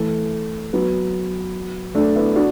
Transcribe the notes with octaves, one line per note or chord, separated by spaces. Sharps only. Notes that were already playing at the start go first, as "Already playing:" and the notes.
Already playing: E3 A3
F#3 B3
A3 D4
B3 E4
D4 F#4